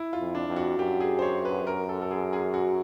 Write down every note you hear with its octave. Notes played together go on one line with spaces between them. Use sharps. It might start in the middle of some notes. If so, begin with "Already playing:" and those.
Already playing: E4
F4
F2
D4
F2
F#4
F#2 G4
G#4
C5
C#5
B4
A#4
A4
A4
G#4
G#4
F#4